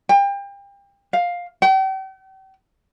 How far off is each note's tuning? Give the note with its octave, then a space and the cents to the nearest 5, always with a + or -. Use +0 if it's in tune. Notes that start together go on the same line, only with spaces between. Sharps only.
G5 +30
F5 +10
G5 -40